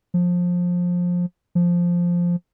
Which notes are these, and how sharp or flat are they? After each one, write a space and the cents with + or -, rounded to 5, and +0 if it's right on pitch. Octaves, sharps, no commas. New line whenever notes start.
F3 +20
F3 +0